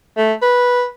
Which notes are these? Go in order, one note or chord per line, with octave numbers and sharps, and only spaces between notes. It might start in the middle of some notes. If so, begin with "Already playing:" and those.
A3
B4